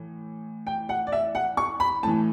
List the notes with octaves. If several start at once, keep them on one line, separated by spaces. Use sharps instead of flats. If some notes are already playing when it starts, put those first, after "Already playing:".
Already playing: A2 E3
G5
F#5
D5
E5
F#5
C#6
B5
A2 E3 A5